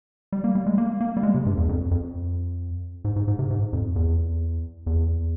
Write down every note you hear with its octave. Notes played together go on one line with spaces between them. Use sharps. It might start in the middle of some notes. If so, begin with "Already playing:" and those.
G3
A#3
G3
G#3
A#3
A#3
G3
G#3
C3
G2
E2
F2
F2
G#2
G#2
G#2
C3
G#2
F2
E2
E2